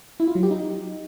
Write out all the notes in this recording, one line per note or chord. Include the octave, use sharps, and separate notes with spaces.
E4
F4
F#3
G4
D#4